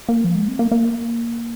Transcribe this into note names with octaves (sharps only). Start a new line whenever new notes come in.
A#3
F3
G#3
C4
A#3
A#3